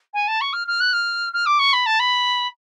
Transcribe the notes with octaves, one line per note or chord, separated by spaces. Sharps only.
G#5
A5
C#6
F6
F6
F#6
F6
F6
D6
C#6
B5
A5
B5